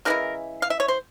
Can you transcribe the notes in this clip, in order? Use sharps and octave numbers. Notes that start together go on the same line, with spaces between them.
C#3 E3 G#3 E4 A#4
F5
E5
C#5
C5